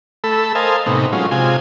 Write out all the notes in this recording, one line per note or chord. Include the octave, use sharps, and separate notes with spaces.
A3 A4 B5 E6
A#4 C5 D#5 F5 G#5 A5
A2 C3 B3 D#4
F#3 G#3 C#4 F4
C3 G#3 F4 G#5